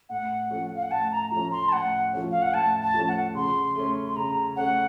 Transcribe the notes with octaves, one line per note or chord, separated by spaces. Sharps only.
A2 F#5
F3 A3 C#4
F5
F#5
A2 A5
A#5
F3 A3 C#4 A#5
C6
A5
A2 F#5
F3 A3 C#4
F5
F#5
A2 A5
A5
F3 A3 C#4
F#5
C#3 C6
A3 C#4
C6
C#3 A#5
A3 C#4 F#5